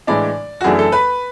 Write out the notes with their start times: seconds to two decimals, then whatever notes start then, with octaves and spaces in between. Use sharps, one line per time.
0.07 A2 E3 G#3 D4 D5
0.61 F#4
0.64 F#2 E3 A3 D4 G#4
0.79 A4
0.92 B4